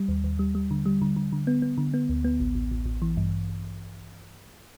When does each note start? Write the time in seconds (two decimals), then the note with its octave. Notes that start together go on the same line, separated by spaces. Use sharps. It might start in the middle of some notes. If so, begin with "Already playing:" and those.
Already playing: G3
0.08 D#2
0.24 D#2
0.39 G3
0.55 G3
0.71 D3
0.86 G3
1.02 D3
1.16 D3
1.33 D3
1.47 B3
1.62 B3
1.78 D3
1.94 B3
2.09 D2
2.24 B3
2.40 A1
2.55 A1
2.71 A1
2.86 A1
3.02 E3
3.17 G2